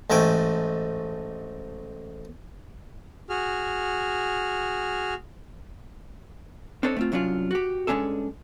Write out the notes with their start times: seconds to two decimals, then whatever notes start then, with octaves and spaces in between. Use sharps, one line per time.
0.10 A1 G#2 A3 G5 G#5
3.29 F#4 G#4 F6
6.83 C4 D4 D#4 A4 C5 C#5
6.97 A3 C4 F4
7.12 C2 F#3 C#4 D4 F4
7.51 F#4 G4
7.87 G2 G#3 C#4 D4 G#4 A4